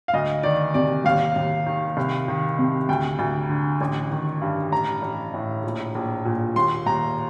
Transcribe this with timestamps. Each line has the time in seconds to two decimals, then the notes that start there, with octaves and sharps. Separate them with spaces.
0.08 F5
0.14 D2 D#5
0.43 D#3 D5
0.74 C3 D5
1.05 D#2 F5
1.36 D#2
1.66 D#3
1.97 C2
2.28 D#3
2.59 C3
2.89 D2 G5
3.19 D2
3.49 D3
3.81 A1
4.12 D#3
4.41 G2
4.72 A1 A#5
5.02 A1
5.34 A2
5.63 A#1
5.95 A#1
6.25 A#2
6.56 D#2 C6
6.86 D#2 A#5